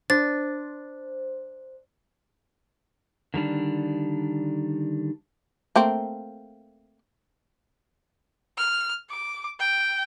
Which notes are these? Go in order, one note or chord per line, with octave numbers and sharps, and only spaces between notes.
D4 C5 A6
D3 D#3 G3 D4
A3 A#3 C4
F6
D6
G5